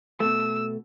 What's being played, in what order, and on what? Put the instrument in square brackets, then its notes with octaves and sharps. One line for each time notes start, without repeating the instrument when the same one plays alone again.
[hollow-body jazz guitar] B2 A3 [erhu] E6